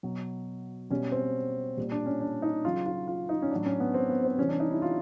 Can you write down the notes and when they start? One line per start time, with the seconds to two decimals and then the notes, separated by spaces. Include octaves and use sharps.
0.03 B2 F#3
0.91 B2 G3 C#4
1.12 C4
1.77 A#2 G3
1.92 D4
2.06 C#4
2.21 D4
2.42 D#4
2.65 C#3 F#3 F4
2.86 F4
3.08 F4
3.29 D#4
3.42 C#4
3.51 A2 F#3 D4
3.66 C#4
3.80 B3
3.94 C4
4.10 B3
4.24 C4
4.38 C3 E3 G3 C#4
4.49 D4
4.60 D#4
4.70 E4
4.82 F4